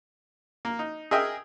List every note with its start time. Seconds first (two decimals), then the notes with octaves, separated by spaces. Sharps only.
0.65 A#3
0.79 D#4
1.11 G#4 A#4 D#5 E5 G5